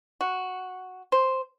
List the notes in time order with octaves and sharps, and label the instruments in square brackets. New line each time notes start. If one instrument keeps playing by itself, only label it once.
[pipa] F#4
C5